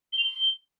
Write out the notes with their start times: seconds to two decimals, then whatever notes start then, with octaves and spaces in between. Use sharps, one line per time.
0.13 G7
0.18 F7
0.24 G7